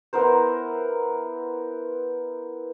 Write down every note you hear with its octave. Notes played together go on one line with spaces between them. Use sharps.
B3 E4 A#4 C5